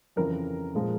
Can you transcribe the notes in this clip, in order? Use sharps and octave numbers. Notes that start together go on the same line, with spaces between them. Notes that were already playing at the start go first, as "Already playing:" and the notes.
F2 C#3 E3 A#4
A#2 F3 G#3